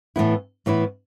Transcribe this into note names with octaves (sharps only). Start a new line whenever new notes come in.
A2 E3 B3 E4
A2 E3 B3 E4